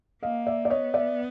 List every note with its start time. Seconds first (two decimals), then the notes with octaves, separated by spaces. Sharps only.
0.23 A#3 D#5 F5
0.47 D5 E5
0.65 D5
0.70 B3 C#5 D#5
0.94 D5 E5